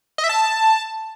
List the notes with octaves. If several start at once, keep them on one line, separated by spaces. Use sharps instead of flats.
D#5
E5
A5